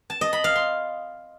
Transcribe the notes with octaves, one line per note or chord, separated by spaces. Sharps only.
A5
D#5
B5
F5
C6